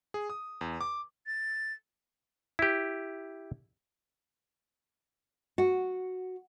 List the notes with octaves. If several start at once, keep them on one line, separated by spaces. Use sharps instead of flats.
G#4
D#6
E2
D6
A6
E4 G4
F#4